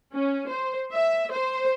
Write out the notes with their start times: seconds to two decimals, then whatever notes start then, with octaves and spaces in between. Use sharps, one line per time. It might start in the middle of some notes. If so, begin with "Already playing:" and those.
0.14 C#4
0.50 C5
0.93 E5
1.32 C5